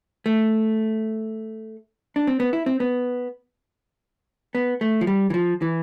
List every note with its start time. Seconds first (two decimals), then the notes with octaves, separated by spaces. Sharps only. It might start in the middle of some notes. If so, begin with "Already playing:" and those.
0.26 A3
2.16 D4
2.27 C4
2.40 B3
2.53 E4
2.66 C4
2.80 B3
4.55 B3
4.81 A3
5.01 F3
5.07 G3
5.30 E3
5.34 F3
5.62 E3